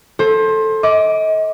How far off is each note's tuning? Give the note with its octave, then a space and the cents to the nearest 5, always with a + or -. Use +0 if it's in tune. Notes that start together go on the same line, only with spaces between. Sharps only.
A4 +0 C5 +25
D#5 +35 D6 +0